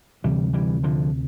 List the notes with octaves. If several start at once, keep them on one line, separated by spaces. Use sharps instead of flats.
D2 C3 E3 G3
E3 G3
D3 F3